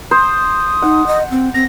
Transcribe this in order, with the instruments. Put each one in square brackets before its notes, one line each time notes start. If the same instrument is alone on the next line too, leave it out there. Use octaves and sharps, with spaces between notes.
[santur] C5 [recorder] D#6
[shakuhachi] D#4 [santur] F#5
[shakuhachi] D#5
C4
[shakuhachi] C4 [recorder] A#6